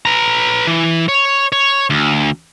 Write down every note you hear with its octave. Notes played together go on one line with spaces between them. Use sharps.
B4 A#5
E3
C#5
C#5
D2